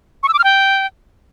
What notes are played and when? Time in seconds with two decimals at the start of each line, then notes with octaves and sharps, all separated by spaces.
0.23 C#6
0.28 E6
0.34 D6
0.39 F6
0.44 G5